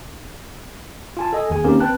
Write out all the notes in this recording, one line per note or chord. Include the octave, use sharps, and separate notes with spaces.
F4 G#5 A5
A4 D#5 G#5
D#2 D#3 G#4 G#5
D#3 A#3 C4 C#4 G4 A#4
C4 B4 G5 A5 F#6